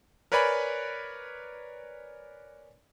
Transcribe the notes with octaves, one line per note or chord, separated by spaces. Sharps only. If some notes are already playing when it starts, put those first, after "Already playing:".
A#4 B4 C#5 D5 G#5 B5